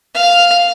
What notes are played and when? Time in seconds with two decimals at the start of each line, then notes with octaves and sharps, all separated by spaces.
0.15 F5